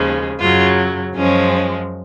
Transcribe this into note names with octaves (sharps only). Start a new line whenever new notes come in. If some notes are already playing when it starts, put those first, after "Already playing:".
Already playing: D#2 C#3 F3 G#3
F#2 C#3 F#3 F4
F#2 F3 G#3 C#4